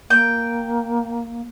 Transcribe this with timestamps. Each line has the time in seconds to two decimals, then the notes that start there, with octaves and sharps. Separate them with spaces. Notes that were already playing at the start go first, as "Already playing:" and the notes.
0.10 A#3 G5